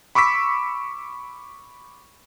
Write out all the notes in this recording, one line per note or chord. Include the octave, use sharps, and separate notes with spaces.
B5 C#6 D6 E6 B6